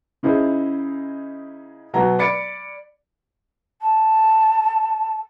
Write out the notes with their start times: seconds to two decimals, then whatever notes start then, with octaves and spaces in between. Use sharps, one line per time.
0.23 C#3 D#4 E4 G#4 C5
1.93 B2 F#3 A#5
2.19 D5 B5 A6 C#7 D7
3.81 A5